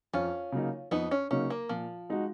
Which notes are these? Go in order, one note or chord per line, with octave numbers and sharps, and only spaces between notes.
F2 C#4 F4
C#3 F#3 A#3 D#4
F2 B3 D#4
C#4
C#3 F#3 A#3 C#4 D#4
A#3
A#2 F3
G#3 D#4 F#4